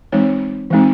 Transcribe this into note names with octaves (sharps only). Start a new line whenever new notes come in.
E3 G#3 C4 D#4 C#5
E3 G#3 C4 D#4